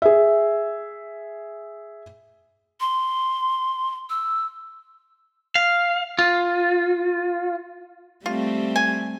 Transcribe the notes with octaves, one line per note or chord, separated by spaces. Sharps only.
G#4 E5
C6
E6
F5
F4
G3 A3 C4 F4
G#5